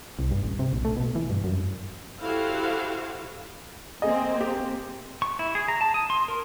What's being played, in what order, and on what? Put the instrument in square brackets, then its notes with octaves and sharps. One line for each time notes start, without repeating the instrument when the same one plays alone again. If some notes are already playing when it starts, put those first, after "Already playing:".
[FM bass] C2
G2
A1
C3
A#1
A3
B2
E3
G2
F#2
[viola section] E4 F#4 G4 A4 C5 F5
[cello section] A#3 C4 [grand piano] G#4 D#5
[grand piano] G4
[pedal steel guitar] C#6
E4
G#4
A#5
A5
D#6
C6
A#4